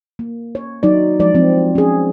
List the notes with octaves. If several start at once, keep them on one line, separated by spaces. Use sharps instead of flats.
A#3
C#5
F#3 D#4 D5
F3 G#3 D5
F3 C4
C#4 G#4